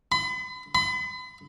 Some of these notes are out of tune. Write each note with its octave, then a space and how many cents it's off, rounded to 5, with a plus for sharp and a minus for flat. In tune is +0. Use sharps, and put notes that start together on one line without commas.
B5 +40
B5 +40